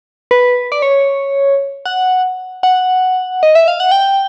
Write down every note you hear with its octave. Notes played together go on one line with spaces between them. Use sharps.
B4
D5
C#5
F#5
F#5
D#5
E5
F5
F#5
G5